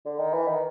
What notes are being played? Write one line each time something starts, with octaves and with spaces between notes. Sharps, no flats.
D3
D#3
E3
D#3